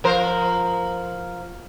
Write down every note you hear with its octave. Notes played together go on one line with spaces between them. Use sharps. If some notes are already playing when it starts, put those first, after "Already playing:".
F3 A#4 C5